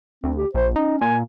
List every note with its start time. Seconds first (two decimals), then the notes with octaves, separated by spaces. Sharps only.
0.24 D2 C4
0.37 G4
0.55 A#1 C5
0.76 C#4 D#4
1.01 A#2 G#5